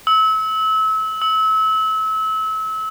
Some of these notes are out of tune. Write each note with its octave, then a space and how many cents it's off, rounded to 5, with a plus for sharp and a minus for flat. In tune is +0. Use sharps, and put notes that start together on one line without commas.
E6 -30
E6 -30